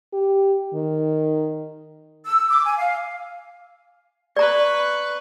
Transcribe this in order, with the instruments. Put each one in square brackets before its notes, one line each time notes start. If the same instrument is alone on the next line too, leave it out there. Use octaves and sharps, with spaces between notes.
[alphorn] G4
D#3
[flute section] E6
D6
G#5
F5
[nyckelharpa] B4 C#6 [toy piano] D5 A#5